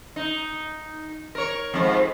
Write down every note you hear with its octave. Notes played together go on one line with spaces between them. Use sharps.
D#4
A#4 C#5
F2 G#2